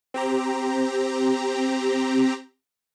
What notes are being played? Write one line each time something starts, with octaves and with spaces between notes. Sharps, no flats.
C4 G4 A#5